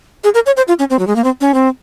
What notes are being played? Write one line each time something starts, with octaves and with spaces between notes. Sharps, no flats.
G#4
A#4
C#5
C5
F4
C#4
C4
F#3
G#3
A#3
C4
C#4
C4